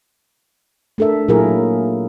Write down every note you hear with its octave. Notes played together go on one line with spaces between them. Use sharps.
A3 D4 A4 A#4 E5
A#2 F#3 A#3 E4 G#4 A#4